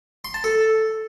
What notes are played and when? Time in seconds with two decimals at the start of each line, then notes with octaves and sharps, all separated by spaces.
0.25 C6
0.34 A5
0.44 A4